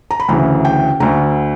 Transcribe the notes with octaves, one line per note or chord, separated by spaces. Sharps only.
A#5
B5
D2 C#3 E3 A#5
G5
D2 D3 A#5